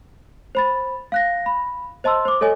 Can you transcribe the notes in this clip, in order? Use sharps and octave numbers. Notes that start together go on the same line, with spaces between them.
C5 B5 A6
F5 F#6 A#6
B5
C5 D#5 A5 C6 E6
C5 D6
A4 C#5 D#5 G#5